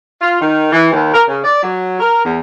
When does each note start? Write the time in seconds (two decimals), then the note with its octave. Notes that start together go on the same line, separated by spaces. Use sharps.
0.21 F4
0.41 D#3
0.72 E3
0.93 D#2
1.12 A#4
1.28 C#3
1.43 D5
1.62 F#3
1.99 A#4
2.25 E2